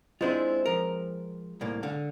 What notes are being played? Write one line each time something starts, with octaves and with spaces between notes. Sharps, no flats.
G#3 C4 D4 E4 F4
F3 A#4
C2 A2 A#3
D3 F5